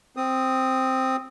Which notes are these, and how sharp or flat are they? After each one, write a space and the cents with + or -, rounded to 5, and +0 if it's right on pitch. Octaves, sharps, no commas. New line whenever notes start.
C4 +0 D#6 +0